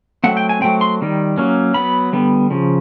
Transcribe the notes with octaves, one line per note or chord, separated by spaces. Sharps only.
F#3 A3 C4 F#5
G5
G#5
F#3 A3 C4 G5
C6
D#3 G3
F#3 A#3 C#4
F#3 B3 B5
D3 G3 B3
C#3 F3